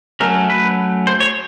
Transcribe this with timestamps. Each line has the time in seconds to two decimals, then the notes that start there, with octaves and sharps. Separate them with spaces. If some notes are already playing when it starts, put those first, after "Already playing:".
0.20 F#3 A3 C#4 A#4
0.50 B4
1.07 C5
1.20 C#5